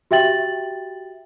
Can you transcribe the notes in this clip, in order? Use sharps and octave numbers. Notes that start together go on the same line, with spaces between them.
F#4 G4 E5 G5 A6 F#7